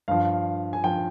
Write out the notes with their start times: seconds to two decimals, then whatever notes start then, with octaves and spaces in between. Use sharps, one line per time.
0.08 G2 F3 F5
0.73 G#5
0.84 F3 G5